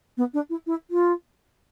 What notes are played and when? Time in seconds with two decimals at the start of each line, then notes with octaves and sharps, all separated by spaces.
0.17 B3
0.34 D4
0.50 E4
0.66 E4
0.90 F4